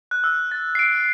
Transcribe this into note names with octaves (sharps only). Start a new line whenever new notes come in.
F#6
E6
A6
C7
D7